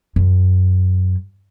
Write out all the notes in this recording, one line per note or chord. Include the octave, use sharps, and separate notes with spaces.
F#2